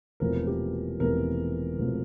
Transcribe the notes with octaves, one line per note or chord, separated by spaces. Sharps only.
E1 E2 C3 F3 A3 A#4
G4
E1 E2 C3 F3 A3 A#4
E1 E2 C3 F3 A3